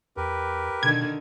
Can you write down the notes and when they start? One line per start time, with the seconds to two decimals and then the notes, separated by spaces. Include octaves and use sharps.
0.17 E2 G4 A#4 B4
0.83 B2 D3 D#3 G#6